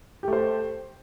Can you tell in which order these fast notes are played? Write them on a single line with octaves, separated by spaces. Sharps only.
G4 A3 C5